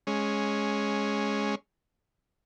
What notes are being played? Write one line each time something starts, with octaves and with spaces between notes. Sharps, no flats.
G#3 C#4